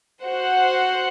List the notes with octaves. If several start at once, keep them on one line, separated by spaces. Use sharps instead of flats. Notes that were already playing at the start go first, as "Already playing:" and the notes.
F#4 C5 F#5